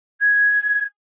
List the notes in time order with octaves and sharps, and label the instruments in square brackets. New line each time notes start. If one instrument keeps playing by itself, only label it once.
[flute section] G#6